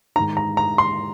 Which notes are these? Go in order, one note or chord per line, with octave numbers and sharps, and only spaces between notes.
G#2 D#3 A#5
A#5
A#5
C6